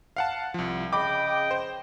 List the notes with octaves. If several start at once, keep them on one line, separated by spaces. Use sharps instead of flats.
F5 F#5 A5
C2 F3
C#3 D#5 G5 B5 D6
C5